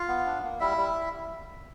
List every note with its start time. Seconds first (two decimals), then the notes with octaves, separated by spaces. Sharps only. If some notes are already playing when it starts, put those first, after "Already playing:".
Already playing: F4 F5
0.08 B3
0.26 D4
0.42 A#3
0.60 G3 E4 E5
0.77 G3